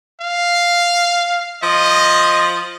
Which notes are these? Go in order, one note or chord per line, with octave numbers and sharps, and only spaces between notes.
F5
F3 D#5